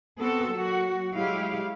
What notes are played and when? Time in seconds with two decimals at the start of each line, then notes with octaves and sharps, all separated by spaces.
0.20 B3 C4 F#4 A4
0.53 F#3 A#3 F#4
1.14 F#3 G#3 E4 G4 F5